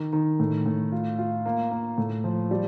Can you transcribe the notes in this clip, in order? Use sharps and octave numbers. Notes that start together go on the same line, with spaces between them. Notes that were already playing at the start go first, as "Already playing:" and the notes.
Already playing: D#3
D#3
A2
A2
F4
F4
A#3
A#3
A2
F3
G3